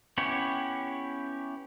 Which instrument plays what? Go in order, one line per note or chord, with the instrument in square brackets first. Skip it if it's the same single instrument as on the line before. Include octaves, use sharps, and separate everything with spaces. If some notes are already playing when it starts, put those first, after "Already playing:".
[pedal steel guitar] B3 C#4 E4 G4 C#5